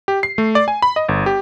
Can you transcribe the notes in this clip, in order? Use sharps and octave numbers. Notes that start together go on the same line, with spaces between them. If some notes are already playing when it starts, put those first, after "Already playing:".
G4
C7
A3
D5
G#5
B5
D#5
G1
G4